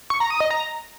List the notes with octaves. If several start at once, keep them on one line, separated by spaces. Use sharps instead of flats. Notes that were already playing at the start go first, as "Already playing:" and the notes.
C#6
A#5
D#6
D#5
A#5